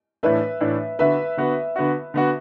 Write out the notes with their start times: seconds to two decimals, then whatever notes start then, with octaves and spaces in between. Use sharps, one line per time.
0.23 A2 E3 A3 D4 B4 E5
0.60 A2 E3 A3 D4
0.99 D3 B3 F#4 B4 E5
1.37 D3 B3 F#4
1.76 D3 B3 F#4
2.14 D3 B3 F#4